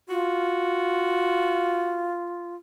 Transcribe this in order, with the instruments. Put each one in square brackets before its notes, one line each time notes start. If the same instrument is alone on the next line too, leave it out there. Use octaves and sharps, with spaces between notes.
[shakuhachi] F4 [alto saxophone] F#4